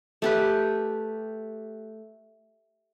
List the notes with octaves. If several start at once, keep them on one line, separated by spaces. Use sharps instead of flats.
A3 G4 B4